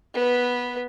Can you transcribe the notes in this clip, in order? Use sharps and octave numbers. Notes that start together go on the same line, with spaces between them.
B3 B4